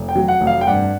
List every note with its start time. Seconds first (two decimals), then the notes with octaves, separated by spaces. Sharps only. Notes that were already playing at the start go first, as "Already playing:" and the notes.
Already playing: F1
0.09 G5
0.16 F#3
0.28 F#5
0.41 F1
0.47 F5
0.61 G5
0.67 G2 F#5